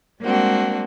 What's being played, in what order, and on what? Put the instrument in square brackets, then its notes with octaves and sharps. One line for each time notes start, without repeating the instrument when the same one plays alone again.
[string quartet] G3 G#3 A#3 C4 D4 F#4